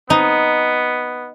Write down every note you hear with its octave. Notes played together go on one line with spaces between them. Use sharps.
B3 D#4